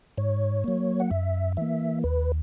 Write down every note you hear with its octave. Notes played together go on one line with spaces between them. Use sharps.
G#2 C#5
F#3 A#3
F#5
F#2 E5
E3 A#3 E5
D#2 B4